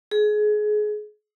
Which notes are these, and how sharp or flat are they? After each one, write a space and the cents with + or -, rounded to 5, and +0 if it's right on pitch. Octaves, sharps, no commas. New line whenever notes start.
G#4 +25